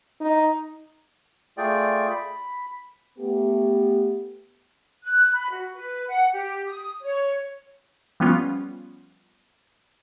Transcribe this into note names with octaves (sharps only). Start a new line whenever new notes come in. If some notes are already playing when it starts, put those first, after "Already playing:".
D#4
A3 F4 G#4 D5 G5
B5
A3 B3 G4
F#6
B5
F#4
B4
F#5
G4
D#6
C#5
F3 G3 B3 C#4 F4